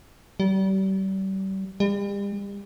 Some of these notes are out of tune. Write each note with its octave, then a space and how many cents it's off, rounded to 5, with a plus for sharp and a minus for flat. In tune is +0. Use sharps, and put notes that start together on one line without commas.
G3 -35
G3 +40